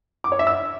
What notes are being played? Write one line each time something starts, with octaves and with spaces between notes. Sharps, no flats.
D6
C#5
E5
E6